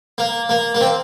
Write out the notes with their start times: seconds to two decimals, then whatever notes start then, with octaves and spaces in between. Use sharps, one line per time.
0.18 A#3
0.49 A#3
0.75 A#3
0.81 C4